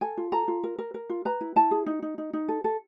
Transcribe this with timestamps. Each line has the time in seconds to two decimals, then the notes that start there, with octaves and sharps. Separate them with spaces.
0.01 A4 G#5
0.17 F4
0.32 A4 A#5
0.48 F4
0.64 A#4
0.79 A#4
0.94 A#4
1.10 F4
1.25 B4 A#5
1.41 E4
1.56 E4 A5
1.71 G#4
1.86 D#4
2.02 D#4
2.18 D#4
2.33 D#4
2.48 A4
2.64 A4